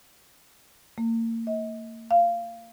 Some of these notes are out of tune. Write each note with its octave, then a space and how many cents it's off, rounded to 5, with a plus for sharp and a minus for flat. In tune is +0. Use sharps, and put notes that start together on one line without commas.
A#3 -35
D#5 +40
F5 -15